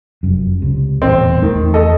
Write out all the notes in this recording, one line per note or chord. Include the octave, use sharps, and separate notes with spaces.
F1 F#2
C#2 C3
D#1 A1 E2 C4
E2 D#3 A3
A4 D#5